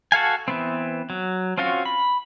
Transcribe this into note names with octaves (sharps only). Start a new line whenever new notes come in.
F#4 A4 F5 G#5
E3 B3 C4
F#3
C4 C#4 F4 F#4 F5
B5